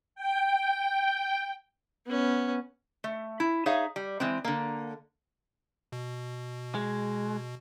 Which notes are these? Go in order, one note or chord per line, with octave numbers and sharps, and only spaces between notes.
G5
B3 C#4
A3
E4
D#4 G#4 C#5 E5 F5
G3
E3 G#3 C4
D3 A#3
B2
G#3